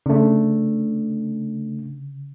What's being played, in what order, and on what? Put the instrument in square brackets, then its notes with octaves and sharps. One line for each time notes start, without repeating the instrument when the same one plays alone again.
[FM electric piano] C#3 [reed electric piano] A3 D4